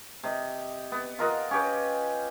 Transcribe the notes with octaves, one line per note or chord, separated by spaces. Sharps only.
C3 D#5
B3
F4 A#4 D#5 F#5
C#4 G4 B4